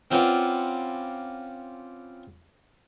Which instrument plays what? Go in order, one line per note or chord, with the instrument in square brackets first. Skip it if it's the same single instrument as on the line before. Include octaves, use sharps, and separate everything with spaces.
[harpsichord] C4 C#4 F4 B4 D5 F#5